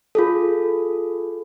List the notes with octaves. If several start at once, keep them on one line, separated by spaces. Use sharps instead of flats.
F4 G#4 A4